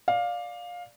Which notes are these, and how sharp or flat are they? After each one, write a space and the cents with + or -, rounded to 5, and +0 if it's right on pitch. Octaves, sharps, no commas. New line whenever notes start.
D5 +0 F5 +15